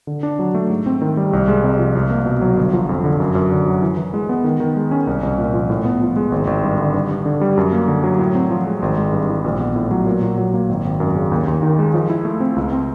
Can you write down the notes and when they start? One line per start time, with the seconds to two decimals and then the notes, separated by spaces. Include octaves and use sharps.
0.07 D3
0.23 D4
0.39 F#3
0.55 A3
0.70 G#2
0.86 C4
1.02 D#3
1.17 G3
1.33 C2
1.48 G#3
1.63 C3
1.79 F3
1.95 C2
2.10 A#3
2.26 B2
2.41 F#3
2.57 G1
2.73 F3
2.89 F2
3.04 D3
3.20 F#2
3.35 F#2
3.51 D3
3.66 F#3
3.82 E3
3.97 E3
4.14 G#3
4.29 B3
4.44 D#3
4.60 D#3
4.76 G#3
4.91 C#4
5.07 C2
5.23 C2
5.38 A#2
5.54 F3
5.70 A2
5.85 B3
6.01 F3
6.16 G#3
6.32 G#1
6.47 G#1
6.63 G2
6.78 D3
6.94 G2
7.11 G2
7.26 D3
7.41 G3
7.57 F#2
7.72 A#3
7.88 D3
8.04 F#3
8.19 A2
8.35 C4
8.50 F3
8.66 G#3
8.82 G#1
8.97 G#3
9.13 G2
9.29 E3
9.44 A#1
9.60 B3
9.76 A2
9.91 F#3
10.06 A#2
10.22 A#2
10.38 F#3
10.54 A#3
10.69 G#1
10.85 G#1
11.00 F#2
11.16 C#3
11.32 D#2
11.48 D#2
11.63 D#3
11.79 G#3
11.94 F3
12.10 E4
12.25 A3
12.40 C4
12.56 C#2
12.72 C4